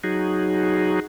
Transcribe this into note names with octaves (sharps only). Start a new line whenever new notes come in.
F#3 D#4 F#4 G#4